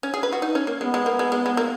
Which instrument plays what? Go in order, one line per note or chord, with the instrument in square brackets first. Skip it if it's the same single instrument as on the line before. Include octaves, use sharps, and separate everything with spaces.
[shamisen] C#4
G#4
B4
F#4
D#4
C#4
A#3
[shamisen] G#3 [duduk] B3
[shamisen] G#3
A#3
G#3
G#3
G#3
A#3